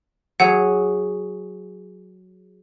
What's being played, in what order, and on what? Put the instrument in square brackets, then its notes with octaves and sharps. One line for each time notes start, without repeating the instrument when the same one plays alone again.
[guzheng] F#3 G#4 [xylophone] F#5